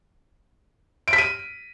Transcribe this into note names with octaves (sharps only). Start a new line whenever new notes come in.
D7
B6
D#7